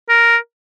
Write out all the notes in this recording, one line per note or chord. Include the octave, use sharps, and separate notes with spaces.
A#4